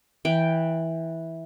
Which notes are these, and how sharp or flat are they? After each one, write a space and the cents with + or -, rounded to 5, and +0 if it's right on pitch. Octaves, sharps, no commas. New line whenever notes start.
E3 -10 G5 +0